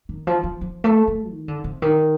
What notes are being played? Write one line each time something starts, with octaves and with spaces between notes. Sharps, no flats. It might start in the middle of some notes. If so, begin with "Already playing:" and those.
D#3
F3
F3
F3
A3
A3
D#3
D3
C3
D#3